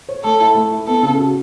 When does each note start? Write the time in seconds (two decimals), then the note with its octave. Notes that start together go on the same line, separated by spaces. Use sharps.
0.09 C#5
0.24 A3 A4
0.40 E4
0.55 A3
0.71 E4
0.87 B3 A4
1.03 C#3
1.19 F#4